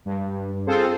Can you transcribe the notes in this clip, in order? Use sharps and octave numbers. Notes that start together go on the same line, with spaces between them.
G2
C4 F4 G#4 A4 C5